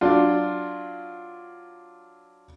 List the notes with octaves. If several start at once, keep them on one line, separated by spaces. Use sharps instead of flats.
F#3 D4 F4